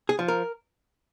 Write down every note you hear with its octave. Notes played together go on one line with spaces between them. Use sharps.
G#4
F3
A#4